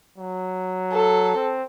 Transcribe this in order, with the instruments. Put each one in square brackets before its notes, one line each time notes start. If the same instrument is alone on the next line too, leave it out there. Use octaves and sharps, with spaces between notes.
[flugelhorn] F#3
[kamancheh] A4
[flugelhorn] C4